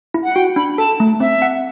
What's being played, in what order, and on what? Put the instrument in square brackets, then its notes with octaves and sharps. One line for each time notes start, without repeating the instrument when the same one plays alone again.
[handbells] E4
[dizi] F#5
[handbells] F#4 [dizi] G5
[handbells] D4 [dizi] B5
[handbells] A4 [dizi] A5
[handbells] A3
[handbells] C4 [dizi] E5
[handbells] F#5